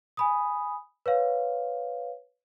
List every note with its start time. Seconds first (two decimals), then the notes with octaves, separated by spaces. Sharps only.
0.17 G#5 B5 D#6
1.06 B4 C#5 F5